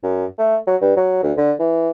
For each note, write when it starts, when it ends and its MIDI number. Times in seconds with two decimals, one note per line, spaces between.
0.03 0.25 42
0.38 0.56 57
0.67 0.76 54
0.81 0.94 43
0.96 1.19 54
1.22 1.32 38
1.37 1.52 50
1.59 1.90 52